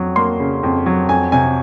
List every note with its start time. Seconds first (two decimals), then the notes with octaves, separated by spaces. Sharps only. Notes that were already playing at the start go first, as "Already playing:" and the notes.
Already playing: F2 F#3
0.16 A#3 C6
0.40 C#3
0.63 F2
0.86 F#3
1.09 F2 G#5
1.32 C3 G#5